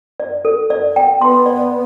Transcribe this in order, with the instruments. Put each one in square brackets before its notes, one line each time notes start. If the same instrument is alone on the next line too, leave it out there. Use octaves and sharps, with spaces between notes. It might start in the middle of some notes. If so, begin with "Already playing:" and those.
[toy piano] D5
A4
D5
G5
[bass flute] B3 [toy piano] C6
[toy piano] D5